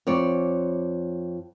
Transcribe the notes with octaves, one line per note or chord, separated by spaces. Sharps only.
F2 C#5 D5